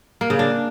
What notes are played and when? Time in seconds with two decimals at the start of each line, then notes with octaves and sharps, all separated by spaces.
0.21 A#3
0.30 C#3
0.39 D4